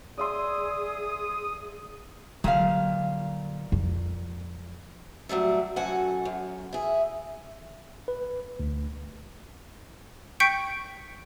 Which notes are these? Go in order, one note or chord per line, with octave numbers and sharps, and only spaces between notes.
G#4 D5 E5 C6 D#6
A#2 D3 F#3 G3 F5
F2
A2 F#3 G3 A3
F#2 F#4 A4 F#5 G#5
F#2
E4 G#4
B4
D2
G5 C#6 G6 B6 C#7 D7